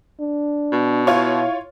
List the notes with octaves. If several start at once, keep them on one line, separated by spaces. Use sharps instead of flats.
D4
B2
E4 F4 C#5